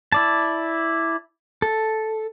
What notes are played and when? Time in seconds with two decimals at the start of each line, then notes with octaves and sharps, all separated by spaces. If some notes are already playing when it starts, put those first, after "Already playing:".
0.12 E4 D5 A5
1.62 A4